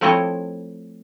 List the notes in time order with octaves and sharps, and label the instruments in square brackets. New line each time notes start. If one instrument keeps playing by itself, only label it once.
[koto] F3 A3 C4 E4 C#5 D#5